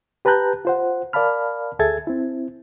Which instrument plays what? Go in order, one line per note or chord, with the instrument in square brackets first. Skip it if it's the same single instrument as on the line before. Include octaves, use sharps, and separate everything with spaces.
[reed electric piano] G4 B4 A5 A#5 F#6 G6
F4 C5 F#5
A#4 D5 F5 A5 B5 F6
D2 G#4 A4 E5 G#6 A6
C4 E4